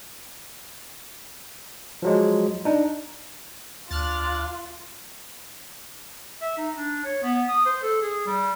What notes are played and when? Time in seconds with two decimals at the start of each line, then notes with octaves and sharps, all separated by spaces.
2.02 F3 F#3 G#3
2.65 D4 D#4
3.91 D2 D4 F4 F6 F#6 A6
6.42 E5
6.57 D#4
6.76 D4
7.04 C#5
7.23 B3
7.49 D#6
7.66 C5
7.83 A4
8.02 G#4
8.27 G3